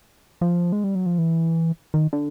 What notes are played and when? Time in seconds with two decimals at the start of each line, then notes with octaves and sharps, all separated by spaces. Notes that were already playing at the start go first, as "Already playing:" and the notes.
0.41 F3
0.72 G#3
0.84 G3
0.95 F#3
1.06 F3
1.18 E3
1.94 D#3
2.13 D3